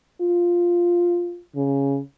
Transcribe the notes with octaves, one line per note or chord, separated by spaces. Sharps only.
F4
C#3